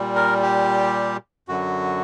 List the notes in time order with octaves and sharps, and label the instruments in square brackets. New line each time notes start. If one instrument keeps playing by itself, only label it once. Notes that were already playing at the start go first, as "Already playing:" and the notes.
Already playing: [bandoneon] A#2 G3
A#4
G4
F#2 D3 F#3 F#4